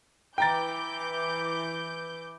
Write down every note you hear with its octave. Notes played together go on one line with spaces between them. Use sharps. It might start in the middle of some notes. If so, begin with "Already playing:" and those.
E3 G5 A#5 D6 G6 A6